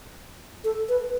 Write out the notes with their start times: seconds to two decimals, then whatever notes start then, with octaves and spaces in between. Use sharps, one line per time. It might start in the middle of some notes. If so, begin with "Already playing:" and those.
0.64 A4
0.89 B4